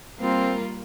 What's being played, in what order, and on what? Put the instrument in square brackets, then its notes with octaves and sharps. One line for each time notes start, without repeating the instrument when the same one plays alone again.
[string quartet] G3 A#3 F4 A#4 [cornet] C4